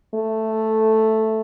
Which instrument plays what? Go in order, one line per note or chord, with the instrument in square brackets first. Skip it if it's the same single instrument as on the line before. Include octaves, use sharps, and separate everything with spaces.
[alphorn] A3